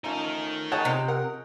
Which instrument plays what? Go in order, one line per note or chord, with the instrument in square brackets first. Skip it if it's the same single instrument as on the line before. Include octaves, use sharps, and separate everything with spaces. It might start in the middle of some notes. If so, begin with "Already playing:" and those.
[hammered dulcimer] F3 A3 C#4 [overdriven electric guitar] D#4 A#4
[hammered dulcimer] G#4 D#5 G5 [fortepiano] C#5 F#5 A5
[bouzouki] C3
[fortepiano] A#4 F#5